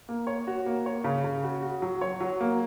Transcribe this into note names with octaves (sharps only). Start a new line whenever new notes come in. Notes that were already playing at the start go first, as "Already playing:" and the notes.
A#3
C#5
F#4
A#3
C#5
C#3
C#3
F#4
F#4
F#3
C#5
F#3
A#3